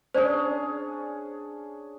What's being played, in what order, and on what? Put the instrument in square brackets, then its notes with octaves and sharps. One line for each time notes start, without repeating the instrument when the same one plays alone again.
[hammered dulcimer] C#4 D4 G#4 [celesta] C5 D5